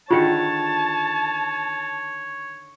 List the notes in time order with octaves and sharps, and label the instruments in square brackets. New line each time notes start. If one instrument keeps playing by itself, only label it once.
[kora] D3 D#3 [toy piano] F4 G#4 G5 [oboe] C#5 [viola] A5